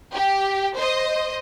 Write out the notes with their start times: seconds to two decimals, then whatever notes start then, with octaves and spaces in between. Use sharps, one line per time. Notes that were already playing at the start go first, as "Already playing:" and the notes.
0.13 G4
0.76 C5 D#5